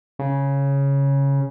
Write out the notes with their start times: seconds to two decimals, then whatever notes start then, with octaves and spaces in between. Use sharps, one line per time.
0.19 C#3